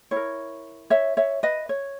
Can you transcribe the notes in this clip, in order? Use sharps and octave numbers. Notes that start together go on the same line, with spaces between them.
E4 A#4 C#5
C#5 E5
C#5 E5
B4 D#5
C#5